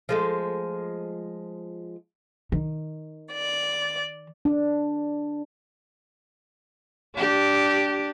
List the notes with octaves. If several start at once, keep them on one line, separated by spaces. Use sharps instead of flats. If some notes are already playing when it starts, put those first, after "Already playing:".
F3 G#3 A3
D#3
D5
D4
D4 G4